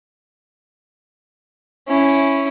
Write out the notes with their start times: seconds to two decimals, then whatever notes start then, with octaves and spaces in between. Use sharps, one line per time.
1.88 C#4 E4